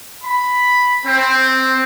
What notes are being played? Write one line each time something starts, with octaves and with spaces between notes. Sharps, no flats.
B5
C4